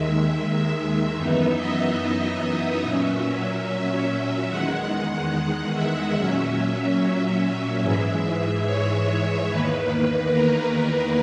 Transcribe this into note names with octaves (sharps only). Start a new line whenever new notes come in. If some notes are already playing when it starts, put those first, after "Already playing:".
Already playing: D#2 D#3 G#3 E5
E5
F#2 E3 B3 D#4 E5
D#5
E5
A#2 F#3 C#4
E5
E2 D#3 G#3 F#5
F#5
E5
A#2 F#3 C#4 E5
E5
G#2 E3 G#3
C#5
E2 D#3 A#3 B4
A#4